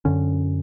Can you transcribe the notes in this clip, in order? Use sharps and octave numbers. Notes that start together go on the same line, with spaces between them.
F#2 D3 C#4